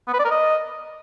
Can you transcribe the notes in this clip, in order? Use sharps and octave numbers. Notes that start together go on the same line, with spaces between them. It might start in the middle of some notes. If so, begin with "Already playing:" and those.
B3
B4
D5
A#4
D#5